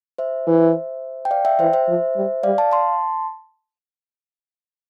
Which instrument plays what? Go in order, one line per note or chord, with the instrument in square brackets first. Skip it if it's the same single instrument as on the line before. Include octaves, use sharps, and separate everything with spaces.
[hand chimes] C5 E5
[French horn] E3
[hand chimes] G5
D5 F5
E5 G5
[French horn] E3 [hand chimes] C5 E5
[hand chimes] C5 E5
[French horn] F3
G3
[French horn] G3 [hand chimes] D5 F5
[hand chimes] F5 A5
A5 C6